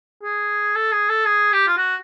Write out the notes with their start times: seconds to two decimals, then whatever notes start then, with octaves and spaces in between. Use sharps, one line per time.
0.23 G#4
0.75 A4
0.92 G#4
1.09 A4
1.26 G#4
1.52 G4
1.68 F4
1.77 F#4